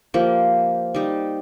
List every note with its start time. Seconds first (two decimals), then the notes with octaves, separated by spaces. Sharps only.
0.14 F3 A#3 G4
0.94 G3 D#4 G4